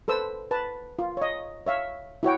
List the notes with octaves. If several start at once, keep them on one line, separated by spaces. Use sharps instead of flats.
A4 B4 C5 E6
B4 A5
F4
C#5 D#5
C#5 E5 F5
E4 F#4 C#5 G5